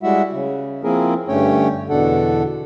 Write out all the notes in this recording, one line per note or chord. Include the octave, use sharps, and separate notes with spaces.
G3 G#3 E4 F#4 E5 F#5
C#3
F3 A#3 C4 E4 G#4 A#4
G2 D3 A3 C#4 C#5 G5
E2 B2 D3 D4 A4 F#5